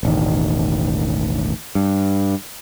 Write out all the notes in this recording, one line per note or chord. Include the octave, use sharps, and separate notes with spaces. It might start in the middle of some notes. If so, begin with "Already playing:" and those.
E1 A1 D#3
G2